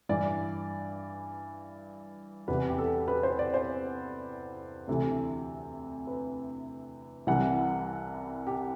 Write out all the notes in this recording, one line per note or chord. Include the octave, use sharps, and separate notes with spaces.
G2 E3 D5
E2 C3 E3 B4
G4
A4
B4
C5
D5
C5
D2 C3 E3 A4
B4
C2 C3 E3 F#5
G4